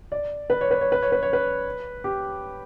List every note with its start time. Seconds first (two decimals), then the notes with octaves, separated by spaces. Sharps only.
0.12 D5
0.50 B4
0.61 C#5
0.71 B4
0.81 C#5
0.92 B4
1.02 C#5
1.12 B4
1.23 C#5
1.33 B4
2.04 G4